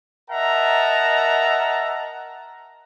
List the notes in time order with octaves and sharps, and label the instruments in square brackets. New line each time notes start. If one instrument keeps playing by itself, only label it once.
[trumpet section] A#4 D#5 E5 F#5 A5 A#5